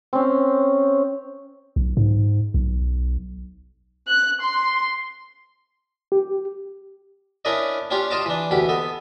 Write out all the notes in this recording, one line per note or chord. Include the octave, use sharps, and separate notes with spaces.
C4 C#4
B1
G#2
B1
F#6
C6
G4
C#4 D4 E4 A#4 D5 D#5
C#4 D4 F4 G4 C#5
F4 C5 D#5 A5 A#5 D6
E3 D4
D2 B2 E3 G4
B3 A4 D#5